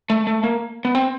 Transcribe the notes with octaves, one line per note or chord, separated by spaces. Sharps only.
A3
A3
A#3
B3
C4